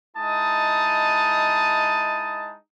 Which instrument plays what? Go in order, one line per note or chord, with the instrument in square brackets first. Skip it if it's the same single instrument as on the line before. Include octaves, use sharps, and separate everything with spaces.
[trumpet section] G#3 D#4 E4 A5 D#6